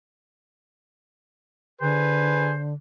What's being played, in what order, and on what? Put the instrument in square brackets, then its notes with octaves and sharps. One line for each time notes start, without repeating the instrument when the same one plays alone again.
[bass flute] D3 [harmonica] G#4 B4 [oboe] C5